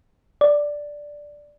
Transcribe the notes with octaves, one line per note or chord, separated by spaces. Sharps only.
D5